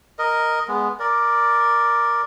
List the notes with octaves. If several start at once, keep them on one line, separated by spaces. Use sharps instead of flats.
A#4 D#5
G#3 B3
A#4 D5